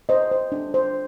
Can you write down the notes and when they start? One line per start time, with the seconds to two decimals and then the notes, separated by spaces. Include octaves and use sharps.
0.09 C5 D#5
0.31 C5
0.52 D4
0.74 C5